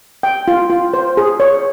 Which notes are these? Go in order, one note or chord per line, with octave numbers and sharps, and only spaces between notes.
G5
F4
F4
C5
G#4
C#5